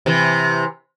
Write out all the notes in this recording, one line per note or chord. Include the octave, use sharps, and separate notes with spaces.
C3 E3